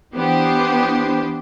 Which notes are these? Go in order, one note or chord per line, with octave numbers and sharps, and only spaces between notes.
E3 B3 D4 G4 C5